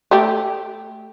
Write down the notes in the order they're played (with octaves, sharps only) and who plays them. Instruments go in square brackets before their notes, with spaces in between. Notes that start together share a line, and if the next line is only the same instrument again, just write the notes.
[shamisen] A3 G4